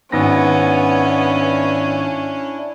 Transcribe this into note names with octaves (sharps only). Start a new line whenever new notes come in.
G#1 B3 C#4 D4 E4 A#6